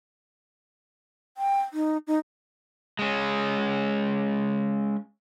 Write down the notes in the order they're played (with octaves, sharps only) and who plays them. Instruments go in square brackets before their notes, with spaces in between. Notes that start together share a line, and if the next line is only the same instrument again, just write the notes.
[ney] G5
D#4
D#4
[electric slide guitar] G#3 C#4